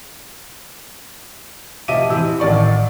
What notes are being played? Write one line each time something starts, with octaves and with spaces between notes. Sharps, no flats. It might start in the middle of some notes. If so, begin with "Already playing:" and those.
F1 D#5 E5 D6 D#7
C3 E3 C4 E6
A1 D#3 D5 C#6